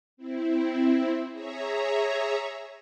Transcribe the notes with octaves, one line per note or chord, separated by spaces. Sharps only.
C4 E4
G#4 C#5 E5 A#5